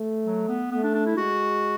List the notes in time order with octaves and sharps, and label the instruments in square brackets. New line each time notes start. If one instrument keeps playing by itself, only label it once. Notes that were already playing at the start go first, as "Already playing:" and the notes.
Already playing: [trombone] A3
[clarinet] F#3
B3
[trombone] A3 [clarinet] B3
[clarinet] D4
D4
E4
[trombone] G#3 [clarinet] F#4